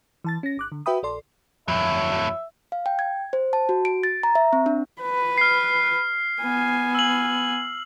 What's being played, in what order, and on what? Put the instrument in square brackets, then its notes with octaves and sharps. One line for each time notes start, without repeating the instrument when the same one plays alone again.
[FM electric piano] E3 A5 A6
C#4 A#6
G1 D6 F#6
D3
F#4 B4 E5 G5 B5 D#6
A#1 A4 D5 C6
[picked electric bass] G1 F2 [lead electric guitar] A2 F#3 [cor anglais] E5
[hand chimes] F5
G5
G#6
C5
A5
F#4
D7
A6
A#5
E5
C4
D4
[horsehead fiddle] B4
[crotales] F6 C7
[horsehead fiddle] B3 G#5
[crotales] E6 F#7